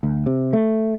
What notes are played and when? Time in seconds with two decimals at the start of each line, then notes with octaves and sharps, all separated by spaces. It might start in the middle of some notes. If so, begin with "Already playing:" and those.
0.03 D2
0.26 C3
0.53 A3